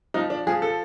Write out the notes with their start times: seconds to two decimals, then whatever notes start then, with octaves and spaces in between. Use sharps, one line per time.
0.14 F3 D#4
0.30 D4
0.47 F3 G#4
0.62 A4